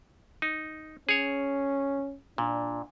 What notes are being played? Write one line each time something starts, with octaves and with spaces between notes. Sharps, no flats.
D#4
C#4 G#4 C#5
A#2 D4